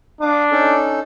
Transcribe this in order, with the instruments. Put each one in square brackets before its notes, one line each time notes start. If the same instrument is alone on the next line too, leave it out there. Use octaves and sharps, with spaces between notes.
[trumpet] D4 [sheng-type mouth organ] F5 D6 D#6
[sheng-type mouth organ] C#4 D#4 A4